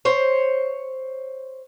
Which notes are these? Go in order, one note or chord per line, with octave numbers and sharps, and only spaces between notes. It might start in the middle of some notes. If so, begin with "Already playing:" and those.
C5 C#5